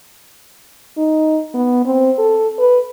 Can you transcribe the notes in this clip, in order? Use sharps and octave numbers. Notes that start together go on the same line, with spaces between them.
D#4
B3
C4
A4
B4